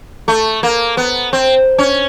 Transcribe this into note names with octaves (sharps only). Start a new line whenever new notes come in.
A3
A#3
B3
C4
C#4